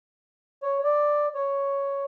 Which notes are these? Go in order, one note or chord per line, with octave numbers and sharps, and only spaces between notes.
C#5
D5
C#5